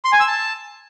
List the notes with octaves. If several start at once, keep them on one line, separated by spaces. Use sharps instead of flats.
C6
G#5
E6
A5